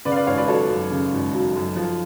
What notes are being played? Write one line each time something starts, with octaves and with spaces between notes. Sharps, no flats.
C#3 B4 D5
F5
B4 D5
G#1 C#5 F5
B4 D5
F#3 A4 C#5
F#2
C#3
G#1
F#3
F#2
F3